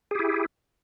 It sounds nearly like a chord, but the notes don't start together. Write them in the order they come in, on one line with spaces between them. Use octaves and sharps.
G#4 G4 E4